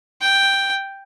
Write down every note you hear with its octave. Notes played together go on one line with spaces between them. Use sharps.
G5